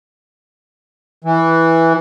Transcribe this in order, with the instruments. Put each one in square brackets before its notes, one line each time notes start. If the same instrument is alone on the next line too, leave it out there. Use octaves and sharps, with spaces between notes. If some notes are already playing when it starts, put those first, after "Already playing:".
[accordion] E3